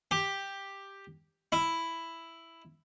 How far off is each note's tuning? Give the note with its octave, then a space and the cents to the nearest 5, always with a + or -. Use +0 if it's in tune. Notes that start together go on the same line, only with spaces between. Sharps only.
G4 +5
E4 +5